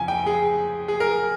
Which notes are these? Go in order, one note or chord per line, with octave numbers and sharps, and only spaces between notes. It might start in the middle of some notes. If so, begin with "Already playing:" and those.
Already playing: F2 C#3 G#5
G5
G#4
G#4
A#4